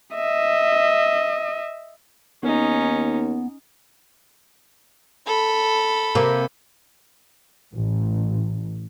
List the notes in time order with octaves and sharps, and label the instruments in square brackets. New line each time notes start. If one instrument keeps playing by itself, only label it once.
[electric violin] D#5 E5
[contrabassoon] D#2 [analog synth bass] B3 [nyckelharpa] C#4 D#4
[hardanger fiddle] A4 B5
[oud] C3 A#3
[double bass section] A1